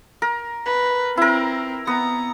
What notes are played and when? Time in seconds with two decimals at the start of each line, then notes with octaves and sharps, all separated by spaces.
0.22 A#4
0.67 B4
1.17 C4 E4 A#4
1.87 B3 A#5